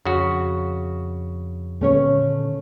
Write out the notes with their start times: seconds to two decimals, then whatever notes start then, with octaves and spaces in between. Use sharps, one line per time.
0.05 F2 C#3 F#4
1.81 A#2 D3 D#3 A3 C#4 C#5